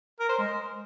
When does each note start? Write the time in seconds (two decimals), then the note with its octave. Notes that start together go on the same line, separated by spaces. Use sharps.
0.20 A#4
0.29 C5
0.38 G#3